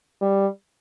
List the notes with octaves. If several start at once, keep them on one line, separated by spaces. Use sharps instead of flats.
G3